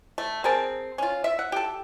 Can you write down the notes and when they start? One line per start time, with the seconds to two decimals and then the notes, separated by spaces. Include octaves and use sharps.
0.18 A3
0.44 C4 G#4 A#4 A5
0.98 C#4 F4
1.24 E5
1.39 F#5
1.52 G4 A4